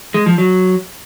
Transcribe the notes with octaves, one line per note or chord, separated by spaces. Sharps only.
G#3
F3
F#3